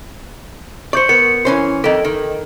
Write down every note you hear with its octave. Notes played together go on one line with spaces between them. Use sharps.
C5 D5 C#6 G6 C#7
B3 A#4 C#7
E3 C#4 C5
F2 D#3 A4 D#5
D#3